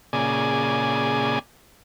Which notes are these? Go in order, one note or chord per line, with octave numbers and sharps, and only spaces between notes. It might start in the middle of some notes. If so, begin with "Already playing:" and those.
A#2 C#3 G#4 D5 G#5